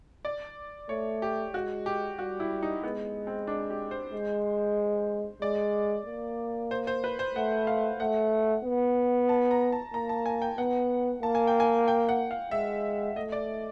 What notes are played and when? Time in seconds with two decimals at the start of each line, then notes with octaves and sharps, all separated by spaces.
0.25 D5
0.89 A3 C#5
1.22 G4
1.54 G#3 F#4
1.86 G4
2.19 G3 F#4
2.40 E4
2.63 D#4
2.83 G#3 B3
3.27 C4
3.47 D4
3.70 G4
3.91 C5
4.12 G#3
5.42 G#3 D5
6.06 A#3
6.71 C5
6.87 C5
7.04 B4
7.19 C5
7.35 A3 F#5
7.67 F5
8.00 A3 F#5
8.65 B3
9.29 A5
9.51 A#5
9.72 A5
9.94 A#3 A#5
10.09 A5
10.26 G#5
10.42 G5
10.58 B3 F#5
11.23 A#3 A5
11.35 G#5
11.47 G5
11.60 G#5
11.88 G5
12.09 F#5
12.31 F5
12.51 G#3 E5
13.16 A3 D#5
13.32 D5